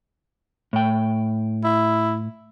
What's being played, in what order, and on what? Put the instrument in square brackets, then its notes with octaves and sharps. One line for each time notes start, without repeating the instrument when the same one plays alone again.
[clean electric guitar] A2 G5
[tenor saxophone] E4